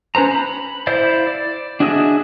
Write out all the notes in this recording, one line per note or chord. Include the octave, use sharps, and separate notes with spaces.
C#4 B4 C5 A#5
B5
E4 C5 D5 F5
D5
D4 F#4 G#4 D#5 E5